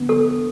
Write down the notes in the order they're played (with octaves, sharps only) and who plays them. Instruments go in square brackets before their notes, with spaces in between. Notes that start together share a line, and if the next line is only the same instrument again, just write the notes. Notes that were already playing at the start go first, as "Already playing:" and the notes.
Already playing: [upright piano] D3 B3
[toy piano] A4